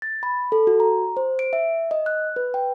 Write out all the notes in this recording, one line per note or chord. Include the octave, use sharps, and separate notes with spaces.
A6
B5
A4
F#4
A#5
C5
D7
E5
D#5
F#6
B4
G5